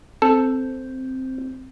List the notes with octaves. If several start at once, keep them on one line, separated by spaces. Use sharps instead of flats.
C4 A4